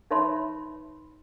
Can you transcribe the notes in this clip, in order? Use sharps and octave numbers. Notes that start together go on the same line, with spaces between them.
D#4 B4 C#5 E5 B5 C6